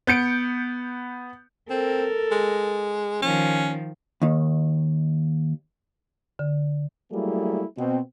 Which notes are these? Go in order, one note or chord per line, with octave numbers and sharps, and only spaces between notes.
B3 G6 C#7 D7
C4 A4 A#4
G#3
D#3 F3 C#4
D#2 D#3
D3
F#3 G3 A3 A#3 E4 G#4
B2 C4